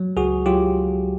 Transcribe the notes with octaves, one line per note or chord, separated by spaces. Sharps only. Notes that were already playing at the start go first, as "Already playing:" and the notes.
Already playing: F#3
C#2 F#4 G#4
F#3 F4 G4